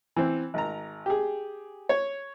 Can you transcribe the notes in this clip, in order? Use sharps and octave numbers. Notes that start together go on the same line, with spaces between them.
E3 C4
G#1 A#5
G4 G#4
C#5